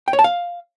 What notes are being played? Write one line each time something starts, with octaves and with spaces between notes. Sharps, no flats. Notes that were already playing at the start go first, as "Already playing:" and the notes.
G5
C#5
A5
F5